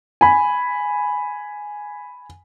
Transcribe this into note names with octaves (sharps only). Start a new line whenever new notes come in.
G#5 B5